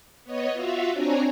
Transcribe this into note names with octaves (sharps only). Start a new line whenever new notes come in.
B3 C#5 D#5
F4 F#4 E5 F5
C4 D4 C#5 G#5 A#5